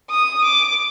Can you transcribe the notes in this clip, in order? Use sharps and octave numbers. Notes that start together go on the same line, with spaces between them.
D#6
D6